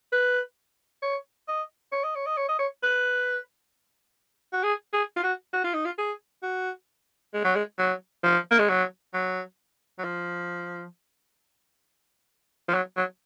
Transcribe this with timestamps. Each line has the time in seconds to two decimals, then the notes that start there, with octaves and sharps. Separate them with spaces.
0.13 B4
1.02 C#5
1.48 D#5
1.92 C#5
2.04 D#5
2.15 C#5
2.26 D#5
2.37 C#5
2.49 D#5
2.59 C#5
2.83 B4
4.53 F#4
4.64 G#4
4.93 G#4
5.17 F4
5.23 F#4
5.53 F#4
5.64 F4
5.74 D#4
5.85 F4
5.98 G#4
6.43 F#4
7.34 G#3
7.44 F#3
7.56 G#3
7.79 F#3
8.24 F3
8.51 A#3
8.59 G#3
8.69 F#3
9.14 F#3
9.99 F#3
10.04 F3
12.69 F3
12.74 F#3
12.97 F#3